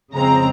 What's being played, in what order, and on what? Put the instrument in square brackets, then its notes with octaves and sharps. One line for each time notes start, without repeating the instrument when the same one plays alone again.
[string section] F2 C#3 G#3 C4 A#5